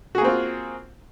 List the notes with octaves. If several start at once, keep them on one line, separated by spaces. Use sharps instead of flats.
A#3 C4 F4 F#4 G#4